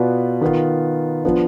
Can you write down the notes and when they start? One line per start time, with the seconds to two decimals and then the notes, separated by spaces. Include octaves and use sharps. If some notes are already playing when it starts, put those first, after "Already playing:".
Already playing: B2 B3 F4 B4 D5
0.41 D#3 B3 F4
1.24 F3 B3 D4